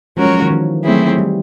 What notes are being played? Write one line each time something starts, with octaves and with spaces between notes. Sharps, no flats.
F3 G#3 C#4 F#4 A#4 C#5
F#3
F3
D#3
E3
F#3 A3 C4 E4 G#4
G3